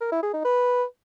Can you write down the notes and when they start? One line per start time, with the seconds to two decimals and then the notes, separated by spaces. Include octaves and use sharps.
0.01 A#4
0.12 E4
0.22 G#4
0.33 D#4
0.44 B4